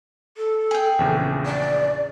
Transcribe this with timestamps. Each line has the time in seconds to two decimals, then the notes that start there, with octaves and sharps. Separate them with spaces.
0.37 A4
0.71 G#4 G5
0.99 A#1 E2 C#3
1.45 D5